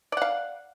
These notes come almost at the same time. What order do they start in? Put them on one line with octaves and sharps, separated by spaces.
D5 F#5 F5